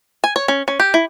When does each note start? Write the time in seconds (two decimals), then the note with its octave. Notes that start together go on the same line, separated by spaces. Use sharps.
0.24 G#5
0.36 C#5
0.48 C#4
0.68 C#4
0.80 G4
0.94 E4